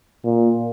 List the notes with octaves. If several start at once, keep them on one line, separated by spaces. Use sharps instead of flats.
A#2